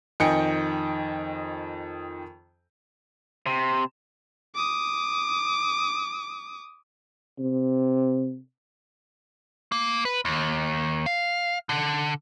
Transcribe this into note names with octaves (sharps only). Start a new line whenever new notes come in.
F2 D#3 D#5 G5 G#5 C#7
C3
D6 D#6
C3
A#3
B4
D#2
F5
D3